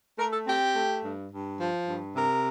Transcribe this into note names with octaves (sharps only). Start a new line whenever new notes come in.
A3 A#4
A4
C4 G4
A3
G2
G2
F3
G2
C3 A#4